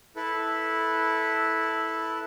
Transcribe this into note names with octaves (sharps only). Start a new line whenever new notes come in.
E4 A4 B4